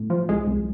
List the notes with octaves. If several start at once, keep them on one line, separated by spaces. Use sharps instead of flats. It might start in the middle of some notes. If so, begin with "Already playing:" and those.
Already playing: A2
F3
C2 G#3
C2